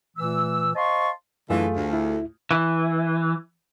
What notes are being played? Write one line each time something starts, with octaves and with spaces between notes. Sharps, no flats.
A#2 E3 A3 E6
C5 D#5 F5 A5 C6 C#6
F#2 D3 E3 A3 F4 G#4
D2
E4
E3